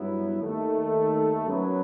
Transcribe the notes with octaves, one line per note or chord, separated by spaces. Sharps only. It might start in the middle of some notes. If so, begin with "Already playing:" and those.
Already playing: G2 F#3 B3 E4
D#2 D#3 A3
F#2 F#3 B3